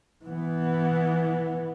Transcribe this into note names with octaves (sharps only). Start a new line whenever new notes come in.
E3 B3